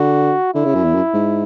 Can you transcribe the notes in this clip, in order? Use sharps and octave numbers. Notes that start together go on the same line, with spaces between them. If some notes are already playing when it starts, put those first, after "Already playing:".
Already playing: D3 F#4
D3 E4
C#3
F#2
E2
F#2
G#2